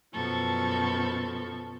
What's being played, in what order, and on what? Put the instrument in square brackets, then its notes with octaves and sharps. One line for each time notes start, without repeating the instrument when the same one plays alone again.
[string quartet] F#2 B2 F3 A4 C#6